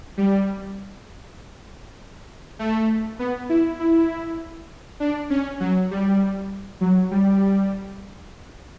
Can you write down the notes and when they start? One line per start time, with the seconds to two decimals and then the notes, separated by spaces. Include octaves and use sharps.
0.17 G3
2.59 A3
3.19 B3
3.49 E4
3.80 E4
5.00 D4
5.30 C#4
5.60 F#3
5.91 G3
6.81 F#3
7.11 G3